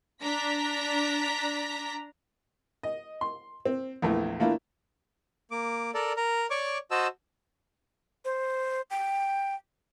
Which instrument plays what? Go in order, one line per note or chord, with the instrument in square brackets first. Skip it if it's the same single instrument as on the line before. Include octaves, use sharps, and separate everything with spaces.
[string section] D4 A#5 B6
[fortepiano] D#5
C6
C4
A#1 E2 E3 A3
E3 A3 A#3 D4 E4 F4
[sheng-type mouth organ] A#3 D6
A4 A#4 D5
A#4
C#5 D5 C#6 D6
F#4 C5 D#5 A5 E6
[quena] C5
G5